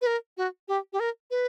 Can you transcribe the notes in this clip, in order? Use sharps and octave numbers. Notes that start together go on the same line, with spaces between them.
B4
A#4
F#4
G4
G4
A#4
B4